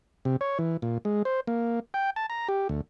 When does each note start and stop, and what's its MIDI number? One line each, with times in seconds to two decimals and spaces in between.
0.25 0.36 48
0.41 0.58 73
0.59 0.77 52
0.82 0.98 46
1.05 1.23 56
1.25 1.40 72
1.47 1.80 58
1.94 2.10 79
2.16 2.26 81
2.30 2.48 82
2.49 2.68 67
2.69 2.81 38